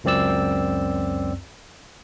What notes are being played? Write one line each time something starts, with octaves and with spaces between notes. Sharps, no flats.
C#2 F#2 C4 D5 E6